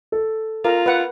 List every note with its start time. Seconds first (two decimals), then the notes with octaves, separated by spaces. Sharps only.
0.12 A4
0.65 F4 A#4
0.86 B4 F#5